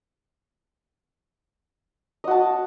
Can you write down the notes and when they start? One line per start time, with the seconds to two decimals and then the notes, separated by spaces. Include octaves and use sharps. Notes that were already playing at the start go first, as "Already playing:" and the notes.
2.24 D#5
2.27 F#4
2.31 A5